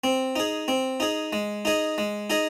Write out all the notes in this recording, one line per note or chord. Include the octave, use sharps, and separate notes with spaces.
C4
D#4 G#4
C4
D#4 G#4
G#3
D#4 G#4 D#5
G#3
D#4 G#4 D#5